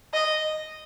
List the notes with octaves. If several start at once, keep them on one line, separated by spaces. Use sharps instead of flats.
D#5